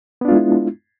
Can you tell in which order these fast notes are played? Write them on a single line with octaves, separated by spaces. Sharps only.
B3 D4 F4 G#3 E4